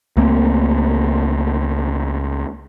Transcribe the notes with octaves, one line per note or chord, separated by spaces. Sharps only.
C#2 A3 A#3 C4